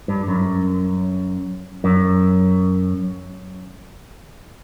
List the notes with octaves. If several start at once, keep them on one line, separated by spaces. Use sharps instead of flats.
G2
F#2
F#2